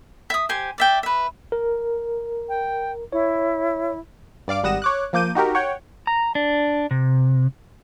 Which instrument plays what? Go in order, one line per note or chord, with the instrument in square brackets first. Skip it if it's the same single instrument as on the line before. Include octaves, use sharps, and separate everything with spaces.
[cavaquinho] E5 D#6
G4 C5 G#5
D5 E5 G5
B4 E5
[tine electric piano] A#4
[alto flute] G5
[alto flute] E4 [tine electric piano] C#5
[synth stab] G2 D5 F5 D6
G#1 G3 F#5 D#6 A#6 E7
C#5 D6 F#6
F3 A#3 D6 G6 D#7
D#4 F#4 G4 A#4
C#5 F#5 G5
[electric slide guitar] A#5
D4
C3